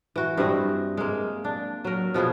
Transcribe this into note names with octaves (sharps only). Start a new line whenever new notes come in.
E3 F#4
G2 C4 E4 D#5
G#3 A#3
D4
F#3 A#4
B2 F3 B3 G#4